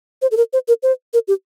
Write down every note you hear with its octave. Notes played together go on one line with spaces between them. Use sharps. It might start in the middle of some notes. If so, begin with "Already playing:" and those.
C5
A4
A#4
C5
A#4
C5
A#4
G4